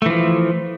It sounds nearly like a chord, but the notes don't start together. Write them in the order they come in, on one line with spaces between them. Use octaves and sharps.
A3 E3 F3